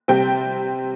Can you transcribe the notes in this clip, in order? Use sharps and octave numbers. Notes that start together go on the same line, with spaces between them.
C3 G3 C4 G5